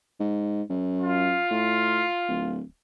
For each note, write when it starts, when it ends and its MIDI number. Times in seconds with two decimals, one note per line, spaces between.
0.20 0.63 44
0.70 1.38 42
1.01 2.56 65
1.51 2.04 45
2.28 2.61 26